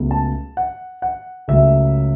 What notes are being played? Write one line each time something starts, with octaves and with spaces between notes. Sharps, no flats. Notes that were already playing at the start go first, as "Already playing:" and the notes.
Already playing: C#2 B2 F#3 A3
A5
F#5
F#5
C#2 C#3 F#3 A3 E5